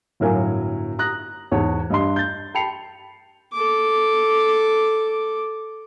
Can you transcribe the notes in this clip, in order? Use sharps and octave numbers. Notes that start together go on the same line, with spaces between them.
G1 A2 F#3 A#4 F5 G#5
A#5 D#6 F#6 A#6
E2 G#2 B3 G#4 C#5 A5
G2 D#5 C6
G6 A6
G5 A5 B5 C7 C#7 F7
A4 D6